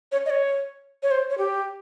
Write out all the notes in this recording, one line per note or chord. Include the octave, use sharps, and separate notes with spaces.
C#5
D#5
C#5
C#5
C5
C#5
G4